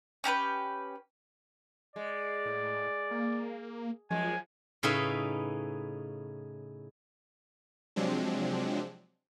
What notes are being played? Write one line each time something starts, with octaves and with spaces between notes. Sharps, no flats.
C#4 G4 A#4 B4
G#3 D5
A2
A#3
F#2 F3 G#3 G#5
A2 C#3 C#4 D#4 B4 E5
C3 F3 F#3 G#3 C4 D4